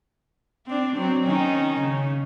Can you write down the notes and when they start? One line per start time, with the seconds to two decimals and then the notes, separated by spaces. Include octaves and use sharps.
0.67 C4 D4
0.96 F#3 C4
1.26 D#3 C#4 D#4
1.80 C#3